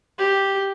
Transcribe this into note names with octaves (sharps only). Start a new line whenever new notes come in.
G4